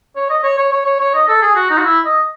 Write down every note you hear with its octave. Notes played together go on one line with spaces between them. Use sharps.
C#5
D#5
C#5
C#5
C#5
C#5
C#5
D#5
A4
G#4
F#4
D#4
F#4
E4
D#5